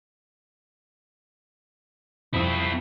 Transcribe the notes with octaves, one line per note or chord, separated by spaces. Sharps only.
F2 C4 E4 D#6